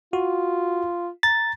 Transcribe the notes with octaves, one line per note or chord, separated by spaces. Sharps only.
F4 F#4
A#5 A6